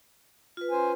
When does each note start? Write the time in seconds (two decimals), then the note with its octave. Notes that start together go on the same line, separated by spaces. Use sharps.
0.57 F4 B4
0.71 C#4 C5 G#5